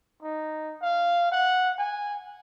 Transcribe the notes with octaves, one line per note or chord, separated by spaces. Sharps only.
D#4
F5
F#5
G#5